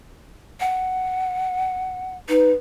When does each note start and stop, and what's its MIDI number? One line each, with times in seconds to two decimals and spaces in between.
0.60 2.17 78
2.29 2.51 63
2.29 2.50 71